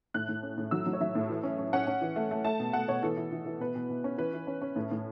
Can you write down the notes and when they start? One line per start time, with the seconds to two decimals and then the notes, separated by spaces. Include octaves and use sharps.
0.14 A2 F#6
0.28 A2
0.43 C#4
0.58 A2
0.71 F#3 E6
0.86 F#3
0.93 C#5
1.00 F#3 E5
1.15 A2
1.29 E3
1.43 C#4
1.58 C#4
1.73 C#4 F#5
1.87 C#4
2.01 E3
2.16 A3
2.31 A3
2.44 A3 A5
2.59 B2
2.73 A3 F#5
2.88 B2 C#5
3.03 E3 A4
3.17 E3
3.32 E3
3.46 E3
3.60 B2 B4
3.75 B2
3.90 B2
4.04 C#4
4.18 E3 B4
4.33 E3
4.47 C#4
4.62 C#4
4.76 A2
4.91 A2